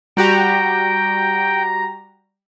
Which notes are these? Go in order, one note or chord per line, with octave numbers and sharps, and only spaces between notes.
G3 F#4 G4 G5 A#5